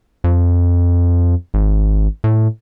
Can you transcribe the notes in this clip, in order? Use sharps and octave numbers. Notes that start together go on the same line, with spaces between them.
F2
G#1
A2